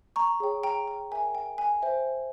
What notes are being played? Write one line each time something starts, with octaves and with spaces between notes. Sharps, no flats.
A#5 C#6
G#4 C#5 G5
G5 A#5
G5
A#4 E5 G5 G#5
G5
G#5
C5 E5 G5